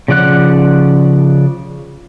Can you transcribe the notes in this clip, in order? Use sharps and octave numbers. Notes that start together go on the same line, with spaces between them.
C#3 F3 D5 F#5 F#6